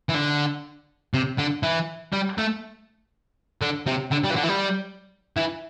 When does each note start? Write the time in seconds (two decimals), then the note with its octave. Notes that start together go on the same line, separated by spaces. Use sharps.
0.09 E3
0.15 D3
1.14 C3
1.38 D3
1.63 E3
2.13 G3
2.38 A3
3.62 D3
3.87 C3
4.12 D3
4.24 G3
4.31 E3
4.36 D3
4.44 E3
4.49 G3
5.37 E3